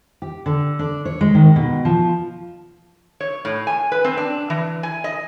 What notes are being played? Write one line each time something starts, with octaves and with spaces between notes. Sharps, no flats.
G4
D3
D4
C#5
G#3
D#3
B2
F3
C#5
A2
G#5
B4
C4
D4
E3
G#5
D#5